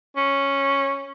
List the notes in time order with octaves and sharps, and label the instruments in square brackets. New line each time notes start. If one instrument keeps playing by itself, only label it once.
[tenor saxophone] C#4